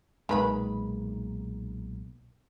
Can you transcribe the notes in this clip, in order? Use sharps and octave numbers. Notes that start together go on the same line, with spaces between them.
B1 A#2 D#3 G#3 B4 B5